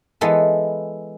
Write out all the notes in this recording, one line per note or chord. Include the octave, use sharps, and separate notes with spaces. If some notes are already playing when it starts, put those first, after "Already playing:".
E3 G#3 B3 A4 B4